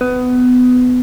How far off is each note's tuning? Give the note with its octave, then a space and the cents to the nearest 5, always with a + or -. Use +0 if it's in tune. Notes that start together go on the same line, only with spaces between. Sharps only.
B3 +20